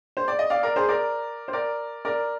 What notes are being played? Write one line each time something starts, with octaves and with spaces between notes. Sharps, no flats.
C5
D5
D#5
D5 F5
A#4 D5
G#4 C5
A#4 D5
C5
A#4 D5
A#4 D5